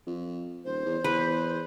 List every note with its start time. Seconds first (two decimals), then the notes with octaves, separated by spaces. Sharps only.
0.07 F2
0.65 D#1 C5
0.85 E2
1.04 E2 B4